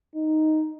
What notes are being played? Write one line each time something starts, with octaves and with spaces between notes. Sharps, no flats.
D#4